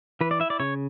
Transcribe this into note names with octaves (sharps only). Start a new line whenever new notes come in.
E3 B4
D5
E4 E5
D5
C#3 C#5